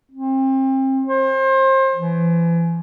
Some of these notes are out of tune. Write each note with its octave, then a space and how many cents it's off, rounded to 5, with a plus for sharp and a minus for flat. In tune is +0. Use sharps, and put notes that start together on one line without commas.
C4 +30
C5 +30
E3 +40